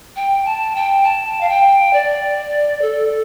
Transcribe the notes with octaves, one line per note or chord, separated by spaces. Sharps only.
G5
A5
G5
A5
F5
G5
D5
A4